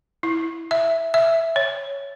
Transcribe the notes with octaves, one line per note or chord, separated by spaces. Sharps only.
E4
E5
E5
C#5